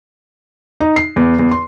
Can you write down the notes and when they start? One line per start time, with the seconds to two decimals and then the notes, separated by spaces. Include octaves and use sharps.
0.80 D#4
0.96 C7
1.16 E2
1.39 E2
1.51 C6